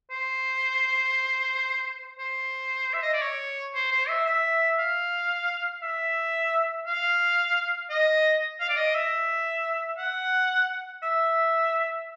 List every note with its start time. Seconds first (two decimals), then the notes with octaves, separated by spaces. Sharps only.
0.10 C5
2.19 C5
2.93 E5
3.02 D#5
3.13 D5
3.22 C#5
3.75 C5
3.92 C5
4.08 E5
4.26 E5
4.79 F5
5.82 E5
6.87 F5
7.90 D#5
8.60 F5
8.69 D5
8.77 D#5
8.94 E5
9.98 F#5
11.03 E5